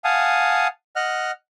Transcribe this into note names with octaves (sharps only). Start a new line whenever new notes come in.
F5 F#5 G#5 A5 D#6
D#5 F#5 F6 F#6